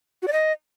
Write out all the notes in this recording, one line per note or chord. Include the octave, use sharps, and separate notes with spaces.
F#4
D5
D#5